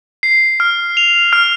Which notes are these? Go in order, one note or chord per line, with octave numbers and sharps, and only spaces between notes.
C7
F6
F7
F6